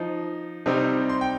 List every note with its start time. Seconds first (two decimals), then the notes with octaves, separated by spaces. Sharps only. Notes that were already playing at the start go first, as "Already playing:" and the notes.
Already playing: F3 D#4
0.66 C3 G3 C4 D#4
1.09 C6
1.21 G5